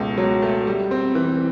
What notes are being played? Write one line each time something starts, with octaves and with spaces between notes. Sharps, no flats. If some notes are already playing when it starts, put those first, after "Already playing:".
Already playing: C#2 B2 A3
F#3
A3
G3
C4
E3